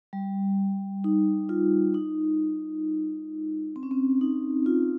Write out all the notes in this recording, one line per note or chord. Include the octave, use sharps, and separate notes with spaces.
G3
D#4
F4
D#4
C4
C#4
C4
D#4
F4